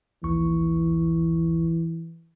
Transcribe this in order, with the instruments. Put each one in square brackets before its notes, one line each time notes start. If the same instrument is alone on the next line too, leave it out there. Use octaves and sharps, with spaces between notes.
[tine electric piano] A#1 D#2 C#6 [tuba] E3